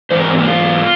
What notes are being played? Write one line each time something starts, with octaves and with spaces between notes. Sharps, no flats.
G#2 E3 C5
A#4
C4
A#3
F4